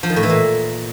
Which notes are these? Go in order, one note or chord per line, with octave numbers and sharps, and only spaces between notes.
F3
D#3
A2
E3
A#2